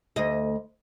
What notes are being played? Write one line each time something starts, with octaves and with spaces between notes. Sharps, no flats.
D2 D#5